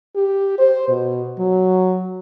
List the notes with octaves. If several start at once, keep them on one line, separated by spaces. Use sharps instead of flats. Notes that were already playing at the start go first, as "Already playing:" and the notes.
G4
C5
B2
F#3